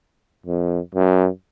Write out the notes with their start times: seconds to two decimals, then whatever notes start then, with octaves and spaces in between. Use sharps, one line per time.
0.46 F2
0.94 F#2